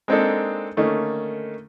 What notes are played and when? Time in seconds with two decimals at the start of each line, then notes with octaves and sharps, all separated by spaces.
0.08 G#3 A#3 C4 D4 D#4 A4
0.77 D3 D#3 A3 A#3 C#4 D#4